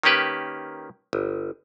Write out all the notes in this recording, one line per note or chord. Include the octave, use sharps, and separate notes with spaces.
D#3 A#3 C#4 G4 B4
G1